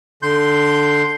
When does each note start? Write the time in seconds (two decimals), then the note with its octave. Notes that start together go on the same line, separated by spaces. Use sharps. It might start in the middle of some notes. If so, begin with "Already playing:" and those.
0.22 D3 C6 G6